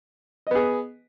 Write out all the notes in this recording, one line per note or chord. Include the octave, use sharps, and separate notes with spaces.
B3 G#4 D#5